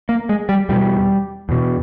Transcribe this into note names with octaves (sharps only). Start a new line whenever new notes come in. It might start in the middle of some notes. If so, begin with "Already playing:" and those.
A#3
G#3
G3
E2 B2 G3
E2 B2